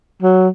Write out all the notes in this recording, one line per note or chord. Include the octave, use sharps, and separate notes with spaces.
F#3